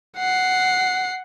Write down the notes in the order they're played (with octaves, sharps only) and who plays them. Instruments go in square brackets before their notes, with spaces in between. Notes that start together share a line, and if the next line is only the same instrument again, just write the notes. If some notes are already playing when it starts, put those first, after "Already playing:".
[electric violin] F#5 C7